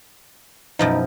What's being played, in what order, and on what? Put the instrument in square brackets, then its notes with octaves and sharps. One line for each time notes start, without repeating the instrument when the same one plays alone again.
[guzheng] F#2 B2 F3 [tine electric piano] D#4